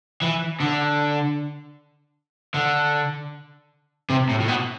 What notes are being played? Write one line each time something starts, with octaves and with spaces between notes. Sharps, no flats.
E3
D3
D3
C3
A2
A2
B2